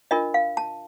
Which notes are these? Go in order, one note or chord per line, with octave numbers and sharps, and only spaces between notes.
D4 F4 A#4 D#5
F5
A5